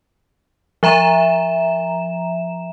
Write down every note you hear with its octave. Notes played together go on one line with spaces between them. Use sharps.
F3 E5 A#5 E7